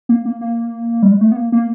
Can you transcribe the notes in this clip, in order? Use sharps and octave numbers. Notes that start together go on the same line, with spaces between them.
A#3
A#3
A#3
G3
G#3
A3
B3
A#3
A#3